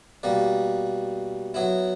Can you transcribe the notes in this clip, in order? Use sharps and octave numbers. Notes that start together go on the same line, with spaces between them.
B2 G3 A#3
F#3 B3 E4